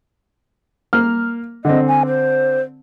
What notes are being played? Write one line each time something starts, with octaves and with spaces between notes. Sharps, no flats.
A#3 F6
D3 C4 D#5
G#5
C5